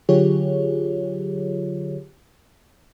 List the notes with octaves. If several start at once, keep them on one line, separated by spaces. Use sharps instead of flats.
D3 F#3 F4 G4 G#4 C#5